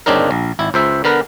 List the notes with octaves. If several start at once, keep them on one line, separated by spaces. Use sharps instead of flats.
G1 C#3 C4 D4 D#4 A#4
A#1
G#1 E4
C#2 C5 E5
D3 B3 A#4 B4